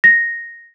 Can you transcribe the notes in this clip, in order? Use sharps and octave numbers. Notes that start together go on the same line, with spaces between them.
A#6